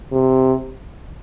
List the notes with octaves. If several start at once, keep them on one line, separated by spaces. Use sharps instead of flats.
C3